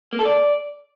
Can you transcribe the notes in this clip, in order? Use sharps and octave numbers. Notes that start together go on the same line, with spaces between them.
A#3
A4
D5